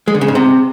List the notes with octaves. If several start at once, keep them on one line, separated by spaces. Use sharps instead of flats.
G#3
D3
C#3
G#2
C3